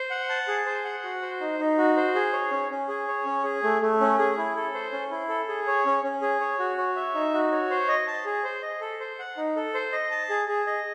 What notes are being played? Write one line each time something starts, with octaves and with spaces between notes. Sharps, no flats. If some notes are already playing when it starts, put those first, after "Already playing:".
Already playing: C5
F#5
A5
G#4
C5
F#5
F#4
C5
D#4
D#4
F#4
C5
G#4
C#5
C#4
C#4
G#4
C#5
C#4
G#4
A3
A3
C#4
G#4
E4
A4
C5
C#4
E4
A4
G#4
C#5
C#4
C#4
G#4
C#5
F#4
C#5
E5
D#4
F#4
C#5
C5
D#5
A5
G#4
C5
D#5
A4
C5
F#5
D#4
A4
C5
D#5
A5
G#4
G#4
D#5